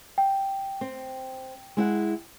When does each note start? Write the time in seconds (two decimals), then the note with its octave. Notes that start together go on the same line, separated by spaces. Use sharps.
0.18 G5
0.81 C4
1.77 G#3 E4 F#5